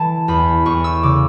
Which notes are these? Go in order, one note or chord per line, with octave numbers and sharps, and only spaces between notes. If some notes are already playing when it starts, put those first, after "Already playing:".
Already playing: E3 A5
E2 B5
E2 C#6
E6
C#3 D6